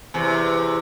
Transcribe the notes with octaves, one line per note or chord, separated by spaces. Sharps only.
E2 C3